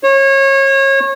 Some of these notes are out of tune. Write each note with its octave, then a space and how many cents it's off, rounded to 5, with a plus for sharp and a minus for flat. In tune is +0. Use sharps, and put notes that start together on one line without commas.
C#5 -30